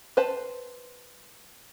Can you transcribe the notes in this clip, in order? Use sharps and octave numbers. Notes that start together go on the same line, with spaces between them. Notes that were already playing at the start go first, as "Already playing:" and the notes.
B4 C5 A5